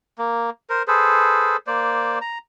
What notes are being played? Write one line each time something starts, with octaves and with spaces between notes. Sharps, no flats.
A#3
A#4 C5
G#4 A4 B4 C5
A#3 C5 D5
A#5